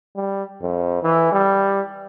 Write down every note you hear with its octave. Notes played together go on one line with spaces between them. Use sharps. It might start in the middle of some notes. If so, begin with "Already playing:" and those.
G3
F2
E3
G3